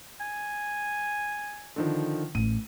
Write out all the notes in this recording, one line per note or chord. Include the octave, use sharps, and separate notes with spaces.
G#5
D3 D#3 F3
A1 D#7